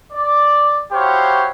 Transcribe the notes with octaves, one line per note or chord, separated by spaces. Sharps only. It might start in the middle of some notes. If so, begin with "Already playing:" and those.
D5
E4 F#4 G4 C5 C#5 F5